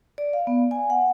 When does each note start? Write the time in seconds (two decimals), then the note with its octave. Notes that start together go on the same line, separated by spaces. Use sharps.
0.18 D5
0.33 F5
0.47 B3
0.71 G#5
0.90 F#5